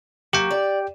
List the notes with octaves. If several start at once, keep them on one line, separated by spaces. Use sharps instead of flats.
F#3 A#3 G4 G5
D5